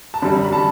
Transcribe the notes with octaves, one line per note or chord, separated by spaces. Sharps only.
A5
F#2 D3 G3 B5
B5
D3 G3 A5